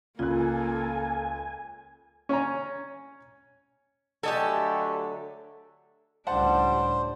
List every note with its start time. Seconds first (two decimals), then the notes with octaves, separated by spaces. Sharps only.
0.19 C#2 C#3 A#3 F4 A4 G#5 F#6
2.29 C#4 C#5 G#5 A#5
4.23 D3 F#3 A3 G4 A4 D#5 G#5
6.27 C#2 A2 G3 D4 C5 F#5 A5